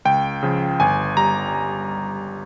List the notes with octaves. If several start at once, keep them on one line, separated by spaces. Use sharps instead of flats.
C#2 G5
C#3 F3
G1 G#5
G3 A#5